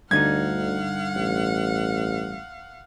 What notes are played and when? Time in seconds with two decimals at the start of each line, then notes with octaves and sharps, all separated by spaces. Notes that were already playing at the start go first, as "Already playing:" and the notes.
0.11 D2 G2 D3 D#4 F5 F#5 G#6
1.16 A1